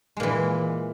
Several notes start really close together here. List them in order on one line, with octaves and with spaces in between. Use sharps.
G#3 A#2 E3